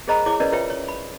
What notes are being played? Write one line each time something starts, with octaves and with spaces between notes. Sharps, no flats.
G#4 A#4 C5 D#5 A#5 B5
E4 G#4 C#5 D6
C#4 A#4 B4 D5 D#5
F4 A#4 B4 C#5 E5 G5
C#5
B5